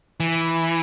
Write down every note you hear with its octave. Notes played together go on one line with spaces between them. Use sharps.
E3